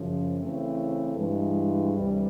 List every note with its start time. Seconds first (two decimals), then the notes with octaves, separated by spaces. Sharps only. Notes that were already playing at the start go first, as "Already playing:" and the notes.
Already playing: F#2 C#3 F3
0.38 C#3 E3 A3 C4
1.15 G2 E3 G#3
1.93 D2 C3 E3 G3